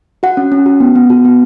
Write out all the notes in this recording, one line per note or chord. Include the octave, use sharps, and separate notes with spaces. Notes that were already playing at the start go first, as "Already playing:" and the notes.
F#4 F#5
C#4
C#4
F#4
B3
B3
F#4
B3